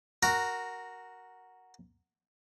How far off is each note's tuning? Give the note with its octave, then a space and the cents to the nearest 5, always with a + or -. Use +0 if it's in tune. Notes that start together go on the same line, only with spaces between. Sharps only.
F#4 +0 A#4 +0